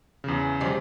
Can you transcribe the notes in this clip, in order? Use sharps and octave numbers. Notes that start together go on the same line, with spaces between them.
E2 C#3
D#3 F3 G3